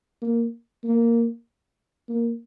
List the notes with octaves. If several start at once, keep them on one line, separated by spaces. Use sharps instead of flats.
A#3
A#3
A#3